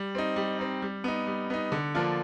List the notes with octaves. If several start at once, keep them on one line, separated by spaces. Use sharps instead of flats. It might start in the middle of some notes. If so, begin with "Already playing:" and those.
Already playing: G3
C4 D#4
G3
C4 D#4
G3
B3 D#4
G3
B3 D#4
D3
F3 A#3 D4 F4